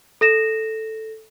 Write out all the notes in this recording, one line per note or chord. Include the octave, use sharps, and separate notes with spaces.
A4 A#6 E7